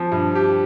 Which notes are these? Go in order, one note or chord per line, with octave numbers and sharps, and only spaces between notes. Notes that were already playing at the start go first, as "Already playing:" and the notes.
Already playing: F3 C4
G2
G4